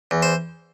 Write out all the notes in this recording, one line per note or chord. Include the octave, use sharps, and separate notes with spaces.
E2
C5